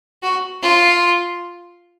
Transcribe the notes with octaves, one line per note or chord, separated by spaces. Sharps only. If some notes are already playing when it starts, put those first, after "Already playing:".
F#4
F4